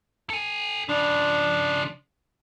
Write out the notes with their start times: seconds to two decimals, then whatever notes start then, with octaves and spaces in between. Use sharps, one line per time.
0.30 A4 G#5
0.89 C#3 F3 D4